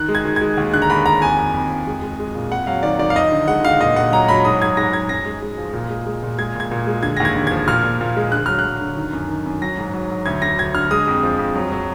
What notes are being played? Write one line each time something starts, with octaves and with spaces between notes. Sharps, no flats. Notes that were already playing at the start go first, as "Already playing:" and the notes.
Already playing: D#3 F#6
G#3
G#6
D#3
G#3 G#6
D#2
D3 F#6
A#5
D#2 B5
D#2 A#5
F2 G#5
F2
F2
F2
G#3
G#3
G#3
A#2
F2 F#5
F#3 F5
D#3 D5
D#3 D5
F5
F3 D#5
D3
G#3 F#5
D3 F5
A#2 D#5
A#2 F#5
F#3 A#5
F#3 B5
G#2 D#6
G#2 G#6
G#2 A#6
G#2 G#6
F#2 A#6
G#3
G#3
F3
A#2
G#3
G#3
A#2
G#3 G#6
A#2 G#6
A#2
G#3
D3 G#6
A#6
D#2
G#6
D3
F3 G#6
A#2 F6
A#2
A#2
G#3
D3 F#6
F#3 F6
F#6
F#3
D3
D#3
F#2
D#3
F#2
F#3 A#6
G#2
F#3
F#3
D2 G#6
D3 A#6
D2 G#6
D3 F6
G#3 D#6
F2
F3
F2
F#3
F#3